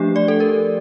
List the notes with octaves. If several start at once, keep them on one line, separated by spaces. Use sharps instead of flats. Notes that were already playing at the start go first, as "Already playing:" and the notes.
Already playing: F3 A3 D4 G4
D5
A4
A#4